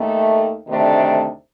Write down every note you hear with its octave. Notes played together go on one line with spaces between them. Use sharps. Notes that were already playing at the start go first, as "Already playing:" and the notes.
Already playing: D#2 D#3 A3
D2 C3 D#3 A3 D4